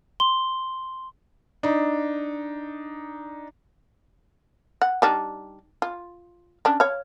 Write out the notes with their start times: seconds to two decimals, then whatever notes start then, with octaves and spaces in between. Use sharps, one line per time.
0.20 C6 G7
1.63 D4 D#4
4.82 F#5
5.02 G3 D4 D#4
5.82 F4
6.65 C#4 D4
6.80 C#5 F5